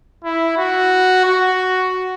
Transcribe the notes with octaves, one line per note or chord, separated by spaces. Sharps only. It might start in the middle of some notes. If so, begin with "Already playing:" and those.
E4
F#4
F#4